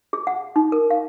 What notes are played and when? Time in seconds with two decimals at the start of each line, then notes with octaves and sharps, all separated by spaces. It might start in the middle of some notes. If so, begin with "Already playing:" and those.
0.13 G#4
0.27 F#5
0.56 D#4
0.72 A#4
0.91 F5